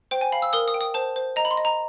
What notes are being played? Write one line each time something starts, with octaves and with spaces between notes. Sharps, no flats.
C5 G5
G#5
F5 B5
E6
A#4 D#6
D#6
G5
D#6
C5 A5
C5
D#5 A#5
B5
C6
D#5
A#5